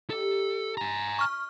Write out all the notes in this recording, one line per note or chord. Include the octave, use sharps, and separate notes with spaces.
D#4 G4 A4
G#5 A#5
C#6 F6